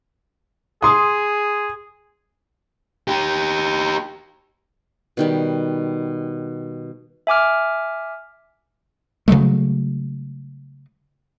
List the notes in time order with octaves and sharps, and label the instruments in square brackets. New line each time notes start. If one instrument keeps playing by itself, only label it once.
[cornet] G#4 [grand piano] C6 D#6
[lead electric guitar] D#4 G4
[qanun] B2 D#3 G3
[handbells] E5 G#5 D6 F6
[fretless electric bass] C#3 F#3 G#3 A3